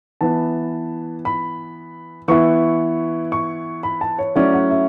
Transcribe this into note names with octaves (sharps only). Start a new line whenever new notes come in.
E3 B3 E4 A5
B5
E3 B3 E4 C#6
C#6
B5
A5
C#5
F#3 A3 C#4 E4 D5
F#5
E5